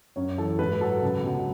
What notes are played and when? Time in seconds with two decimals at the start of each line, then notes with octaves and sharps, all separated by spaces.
0.16 F#2 C#5
0.38 E3 A4
0.59 G#2 B4
0.80 F#3 A4
1.02 C#2
1.23 B2 F#3